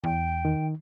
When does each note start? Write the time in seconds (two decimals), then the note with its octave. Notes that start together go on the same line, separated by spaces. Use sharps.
0.04 E2 G5
0.45 D#3